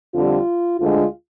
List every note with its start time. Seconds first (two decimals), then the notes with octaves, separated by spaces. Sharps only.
0.14 F2 D3 G3 F4
0.80 D2 D3 G#3 F4